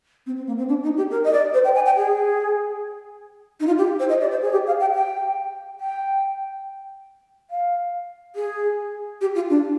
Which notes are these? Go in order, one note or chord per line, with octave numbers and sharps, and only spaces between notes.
C4
C4
A#3
C4
D4
D#4
G4
A#4
D#5
D5
C5
G5
G#5
G5
G#4
D#4
F4
G4
C5
D#5
D5
C5
G#4
G4
F5
G5
G5
G5
F5
G#4
G4
F4
D4